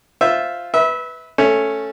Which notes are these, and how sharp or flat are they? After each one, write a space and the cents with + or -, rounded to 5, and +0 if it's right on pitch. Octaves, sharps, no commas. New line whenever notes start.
F4 +0 C5 +0 E5 +0
B4 +0 E5 -25
A3 +0 C#4 +0